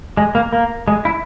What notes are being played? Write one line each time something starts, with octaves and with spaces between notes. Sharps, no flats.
G#3
A#3
A#3
G#3
E4